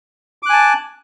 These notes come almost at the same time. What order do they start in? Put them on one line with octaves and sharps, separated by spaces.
D6 F#6 G#5 A5